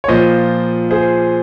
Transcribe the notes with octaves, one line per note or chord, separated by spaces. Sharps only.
C#5
A#2 F3 C5 D#5
G#4 C5